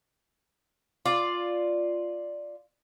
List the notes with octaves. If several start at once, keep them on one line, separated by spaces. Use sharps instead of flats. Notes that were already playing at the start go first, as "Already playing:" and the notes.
F4 D5